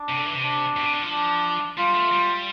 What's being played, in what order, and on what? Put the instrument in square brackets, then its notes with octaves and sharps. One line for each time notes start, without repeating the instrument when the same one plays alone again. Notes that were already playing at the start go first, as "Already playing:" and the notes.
Already playing: [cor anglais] D4
[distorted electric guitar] C3
D3
E3
C3
[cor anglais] D4
[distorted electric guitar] B2
C3
D3
F3
[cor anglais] D4
[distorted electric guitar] G3 [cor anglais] F4
[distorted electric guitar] A3
G3